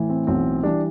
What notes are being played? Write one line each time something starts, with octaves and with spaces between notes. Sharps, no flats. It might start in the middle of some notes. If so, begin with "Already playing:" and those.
Already playing: A2 E3
C4
B1 A2 E3 C4
E3 G3 D4